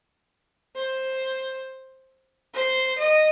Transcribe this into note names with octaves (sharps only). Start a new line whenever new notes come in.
C5
C5
D#5